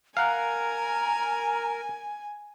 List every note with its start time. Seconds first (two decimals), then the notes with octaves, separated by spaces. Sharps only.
0.17 A#4 F5 F#5 G#5 A#5